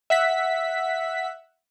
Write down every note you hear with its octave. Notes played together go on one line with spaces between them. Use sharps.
E5 F#5 B6